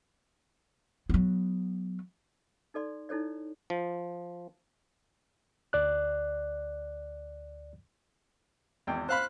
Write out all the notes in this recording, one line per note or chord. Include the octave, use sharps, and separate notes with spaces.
F#3 B3
D#4 A4 D5 C6
D#4 E4 A4 C#5 D5
F3
D2 D5 F#6
G#1 E2 G5
C5 F5 B5 F#6